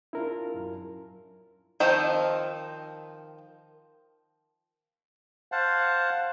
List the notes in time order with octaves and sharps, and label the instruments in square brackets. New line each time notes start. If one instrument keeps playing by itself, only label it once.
[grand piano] D4 F4 [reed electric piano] E4 A#4
[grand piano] F#2
[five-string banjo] D#3 F3 C4 D#4
[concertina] C5 F5 F#5 A5